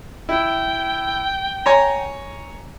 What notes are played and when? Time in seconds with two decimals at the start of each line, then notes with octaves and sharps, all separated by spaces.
0.29 E4 G5
1.66 C#5 G#5 A#5